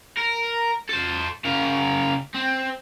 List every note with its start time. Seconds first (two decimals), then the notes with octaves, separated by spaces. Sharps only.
0.17 A#4
0.89 A4 C5
1.45 C#3 A#4
2.35 C4